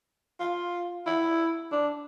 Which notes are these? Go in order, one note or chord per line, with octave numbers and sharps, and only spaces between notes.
F4
E4
D4